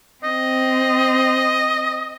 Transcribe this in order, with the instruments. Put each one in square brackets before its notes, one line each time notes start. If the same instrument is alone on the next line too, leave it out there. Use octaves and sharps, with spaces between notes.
[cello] C4 [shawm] D#5